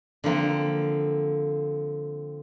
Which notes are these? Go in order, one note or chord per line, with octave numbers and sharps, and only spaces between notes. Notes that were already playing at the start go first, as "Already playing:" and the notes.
D3 F3 A#3 C4